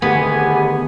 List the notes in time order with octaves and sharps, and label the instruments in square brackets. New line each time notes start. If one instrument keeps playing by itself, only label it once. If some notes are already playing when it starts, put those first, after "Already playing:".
[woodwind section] C2 G#2 G#5 [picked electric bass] D3 D#3 A3 [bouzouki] B3 [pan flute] G4